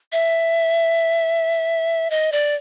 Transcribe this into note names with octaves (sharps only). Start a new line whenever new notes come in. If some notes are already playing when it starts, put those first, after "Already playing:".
E5
D#5
D5